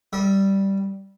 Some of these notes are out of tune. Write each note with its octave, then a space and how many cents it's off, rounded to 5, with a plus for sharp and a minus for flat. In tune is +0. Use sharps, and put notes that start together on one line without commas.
G3 -5 E5 -40